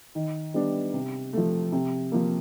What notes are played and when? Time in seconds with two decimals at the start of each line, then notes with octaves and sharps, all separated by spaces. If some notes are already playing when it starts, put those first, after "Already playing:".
0.15 D#3
0.54 G3 B3 D4
0.93 C3
1.33 F3 A3
1.72 C3
2.12 F3 A#3